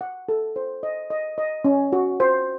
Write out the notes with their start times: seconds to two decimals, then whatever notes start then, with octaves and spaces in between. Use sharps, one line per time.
0.01 F#5
0.29 A4
0.56 C5
0.83 D#5
1.10 D#5
1.38 D#5
1.65 C#4
1.92 F#4
2.20 C5